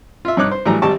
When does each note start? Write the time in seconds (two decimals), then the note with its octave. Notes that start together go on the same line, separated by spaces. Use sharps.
0.25 F4 E5
0.37 G2 D#4 C#5 D6 F#6
0.51 C5
0.66 A2 E3 F#3 G3 A#5
0.82 G#1 G3 G4 A5 C#6